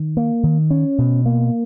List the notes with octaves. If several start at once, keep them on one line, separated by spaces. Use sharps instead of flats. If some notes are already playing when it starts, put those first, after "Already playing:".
Already playing: D#3
A#3
D#3
C#4
B2
A#3